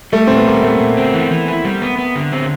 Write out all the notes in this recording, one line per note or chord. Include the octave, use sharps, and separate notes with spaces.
G3 A3
A#2 C4
B3
G3 A#3
A#2 A3
A#2
C4
E3
E3
E4
G3
B3
B3
D3
C4